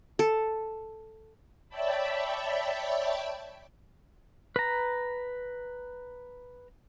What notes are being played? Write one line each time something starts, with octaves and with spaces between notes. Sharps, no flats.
A4
C#5 D5 E5 G5 A5 B5
B4 A#5